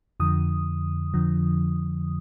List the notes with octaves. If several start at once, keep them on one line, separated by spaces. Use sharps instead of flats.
F2 D3 F3 D#6
F2 D3 F3